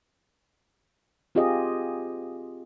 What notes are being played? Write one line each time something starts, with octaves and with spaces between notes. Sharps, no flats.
C4 F4 G4 G#4 D#5